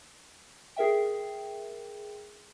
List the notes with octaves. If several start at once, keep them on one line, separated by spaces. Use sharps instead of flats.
G#4 A#4 E5 G5